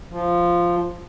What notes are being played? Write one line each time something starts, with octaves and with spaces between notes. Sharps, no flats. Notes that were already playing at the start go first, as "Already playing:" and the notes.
F3